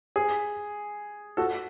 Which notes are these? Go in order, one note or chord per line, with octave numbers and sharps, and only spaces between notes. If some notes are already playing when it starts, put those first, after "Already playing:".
G#4
F#4 A4